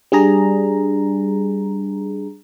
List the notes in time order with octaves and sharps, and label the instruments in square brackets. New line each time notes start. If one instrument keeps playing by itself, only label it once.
[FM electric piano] G3 D4 G#4 A#5